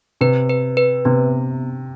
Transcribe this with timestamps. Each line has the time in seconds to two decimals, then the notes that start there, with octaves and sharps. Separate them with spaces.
0.21 C3 B4
0.49 B4
0.77 B4
1.05 C3 B3